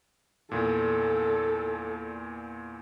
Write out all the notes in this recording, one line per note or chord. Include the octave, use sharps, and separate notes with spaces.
E2 A#2 A4